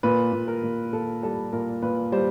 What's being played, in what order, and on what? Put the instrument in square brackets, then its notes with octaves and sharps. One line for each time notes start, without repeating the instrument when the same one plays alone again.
[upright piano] A#2 B4
A#2
A#4
A#2
A#2 A4
G3 A4
A#2 A#4
A#2 B4
G3 C5